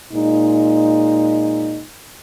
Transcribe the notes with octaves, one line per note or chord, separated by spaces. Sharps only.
A#2 G#3 D#4